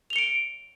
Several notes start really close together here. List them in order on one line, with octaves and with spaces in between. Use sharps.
F7 G7 C#7 D7